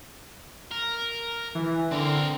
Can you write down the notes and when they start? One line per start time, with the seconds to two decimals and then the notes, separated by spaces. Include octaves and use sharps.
0.71 A#4
1.55 E3
1.91 D3 C4 A#4